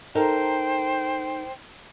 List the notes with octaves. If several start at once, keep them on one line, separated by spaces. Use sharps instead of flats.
D#4 A4 A#4 C5 G5